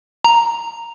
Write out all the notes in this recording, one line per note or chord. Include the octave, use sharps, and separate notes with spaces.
A#5